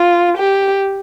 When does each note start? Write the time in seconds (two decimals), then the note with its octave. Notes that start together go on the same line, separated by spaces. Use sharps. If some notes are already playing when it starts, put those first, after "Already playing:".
Already playing: F4
0.37 G4